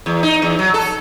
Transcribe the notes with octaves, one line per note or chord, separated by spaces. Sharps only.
E2
D#4
E2
F#3
A4